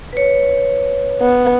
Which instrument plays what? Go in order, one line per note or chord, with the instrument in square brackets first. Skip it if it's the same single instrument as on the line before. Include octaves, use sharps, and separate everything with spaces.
[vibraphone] B4 C#5
[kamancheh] B3